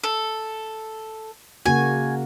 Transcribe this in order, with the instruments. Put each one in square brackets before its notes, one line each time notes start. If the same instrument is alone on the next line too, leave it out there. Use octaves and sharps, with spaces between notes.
[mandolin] A4
[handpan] C#3 A#3 F#4 [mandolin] G#5